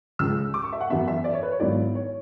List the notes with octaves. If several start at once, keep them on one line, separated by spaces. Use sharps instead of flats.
C#2 C#3 G#3 E6
D6
C#6
E5
F#5
F#2 E3 B3 E5
E5
D5
C#5
B4
C#5
G#1 G#2 F#3 B3 E4 D5
C#5